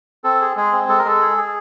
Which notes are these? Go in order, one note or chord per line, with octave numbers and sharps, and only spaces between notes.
C4 A4
G#4
G#3 G#4
C4
G#3 A4
A#4
G#3 A4
G#4
G#4